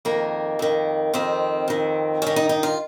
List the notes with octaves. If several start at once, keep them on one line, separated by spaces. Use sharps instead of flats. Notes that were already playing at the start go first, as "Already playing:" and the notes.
F2 D#3 A#3
F2 D#3
F2 D#3 C4
F2 D#3
G2 D#3 C#4
D#4
D#4
F4